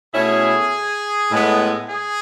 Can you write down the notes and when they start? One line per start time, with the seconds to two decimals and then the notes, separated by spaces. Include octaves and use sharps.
0.14 B2 A3 C#4 E4 G#4
1.31 A2 G#3 B3
1.90 G#4